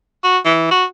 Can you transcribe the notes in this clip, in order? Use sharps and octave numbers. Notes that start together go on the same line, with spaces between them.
F#4
E3
F#4